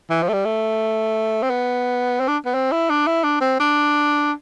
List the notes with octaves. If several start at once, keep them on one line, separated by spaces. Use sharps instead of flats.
E3
F3
A3
G3
A3
C4
B3
C4
D4
B3
C4
E4
D4
E4
D4
C4
D4